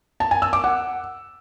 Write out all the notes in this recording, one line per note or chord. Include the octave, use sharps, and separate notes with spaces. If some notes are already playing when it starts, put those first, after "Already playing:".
A5
G#5
E6
D6
F#5